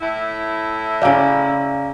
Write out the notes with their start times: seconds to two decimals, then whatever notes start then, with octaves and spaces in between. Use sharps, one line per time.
0.01 A2 E4
1.02 C#3 G4 D5 F5 A#5